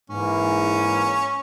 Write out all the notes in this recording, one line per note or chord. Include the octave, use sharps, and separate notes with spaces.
G#2 E3 A#3 C#4